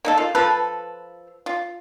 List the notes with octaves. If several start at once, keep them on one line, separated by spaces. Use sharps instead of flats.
A#3 D#4 A4
F4
F3 F4 A4 B4
F4